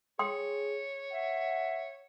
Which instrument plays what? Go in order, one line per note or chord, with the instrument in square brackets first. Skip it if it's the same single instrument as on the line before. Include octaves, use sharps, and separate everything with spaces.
[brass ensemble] G#4 [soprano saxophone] C#5 [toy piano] G5 C6 D#6
[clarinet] E5 [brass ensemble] F#5